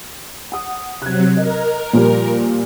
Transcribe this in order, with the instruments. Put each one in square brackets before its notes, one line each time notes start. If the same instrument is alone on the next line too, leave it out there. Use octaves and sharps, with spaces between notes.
[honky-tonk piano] F#5 D#6
[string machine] C3 F#3 [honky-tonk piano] F#6 G#6
[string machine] A#4 [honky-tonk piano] D#5
[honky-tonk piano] A#2 F3 G3